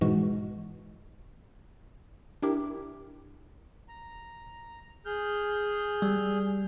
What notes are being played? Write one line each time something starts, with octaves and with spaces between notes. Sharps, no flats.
G#2 B2 E3 G#3 F#4
D4 E4 G4 A#4
A#5
G#4 F6 G6
G3